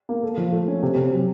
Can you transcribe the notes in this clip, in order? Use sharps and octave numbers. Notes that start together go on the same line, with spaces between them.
A#3
A4
F3
A3
C#4
C3
C3
F#3